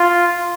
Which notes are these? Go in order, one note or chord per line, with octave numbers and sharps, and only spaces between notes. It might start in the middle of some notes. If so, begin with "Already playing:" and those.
Already playing: F4